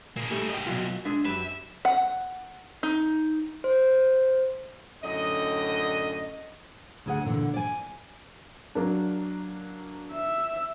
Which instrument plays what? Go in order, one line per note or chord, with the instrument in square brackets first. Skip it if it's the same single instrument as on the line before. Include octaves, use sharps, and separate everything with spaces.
[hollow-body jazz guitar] A#2 [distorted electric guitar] A#3 G#4
[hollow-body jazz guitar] G3 A3 G4
D#5 G5
B2 F#3 F4
G#3 D4 E5
[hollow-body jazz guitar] F#2 G4 B4 [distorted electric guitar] E5
[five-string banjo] F#5
D#4
[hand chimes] C5
[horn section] F#2 A2 D3 D#5
[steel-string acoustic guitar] D2 G#4 F#5
A#2 D3 E3
D5 G#5
[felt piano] F#3 A#3 D4
[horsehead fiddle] E5